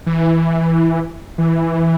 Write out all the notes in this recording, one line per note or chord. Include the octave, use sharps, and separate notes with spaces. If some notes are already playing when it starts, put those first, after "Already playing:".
E3
E3